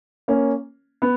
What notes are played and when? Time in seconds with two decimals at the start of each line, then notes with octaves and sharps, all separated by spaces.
0.28 A#3 C#4
1.02 B3